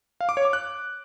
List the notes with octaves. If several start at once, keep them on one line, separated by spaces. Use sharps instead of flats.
F5
D6
C#5
D6
F#6